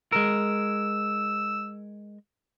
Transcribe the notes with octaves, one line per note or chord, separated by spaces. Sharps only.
G#3 A#4 E6